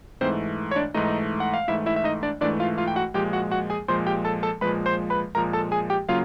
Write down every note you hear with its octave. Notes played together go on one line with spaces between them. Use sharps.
G#2 E3 A3 C4 C5
C#5
D4 D5
G#2 E3 A3 D#4 D#5
F#5
F5
G#2 E3 A3 E4 E5
E4 E5
E5
D#4 D#5
D4 D5
G#2 E3 A3 D4 D5
F4 F5
F4 F5
G5
F#4 F#5
A#2 F3 G#3 G4 G5
F#4 F#5
F#4 F#5
G#4 G#5
A#2 F3 G#3 C5 C6
G4 G5
A4 A5
A4 A5
A#2 F3 G#3 B4 B5
C5 C6
B4 B5
A#2 F3 G#3 A#4 A#5
A4 A5
G#4 G#5
G4 G5
C#3 F#3 A#3 F4 F5